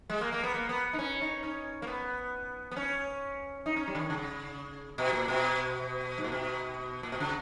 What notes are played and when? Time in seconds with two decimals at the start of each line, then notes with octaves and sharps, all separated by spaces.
0.10 G#3
0.21 A#3
0.32 A#3
0.43 B3
0.54 A#3
0.69 B3
0.93 D#4
0.99 C#4
1.22 D#4
1.43 C#4
1.82 A#3
1.87 B3
2.71 B3
2.76 C#4
3.66 D#4
3.76 C#4
3.87 G3
3.95 C#3
3.99 D#3
4.10 C#3
4.98 B2
5.13 A#2
5.28 B2
6.18 G#2
6.24 A#2
6.32 B2
7.03 A#2
7.12 B2
7.20 C#3